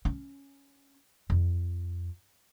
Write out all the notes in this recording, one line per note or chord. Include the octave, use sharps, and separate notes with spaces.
C#4
F2